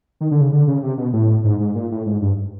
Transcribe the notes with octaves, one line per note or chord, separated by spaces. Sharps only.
D#3
D3
C#3
D3
C#3
C3
B2
A2
G#2
G#2
A#2
A2
G#2
G2